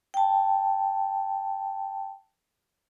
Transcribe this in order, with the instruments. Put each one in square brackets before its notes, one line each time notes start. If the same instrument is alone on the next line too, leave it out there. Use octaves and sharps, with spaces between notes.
[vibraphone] G5 A5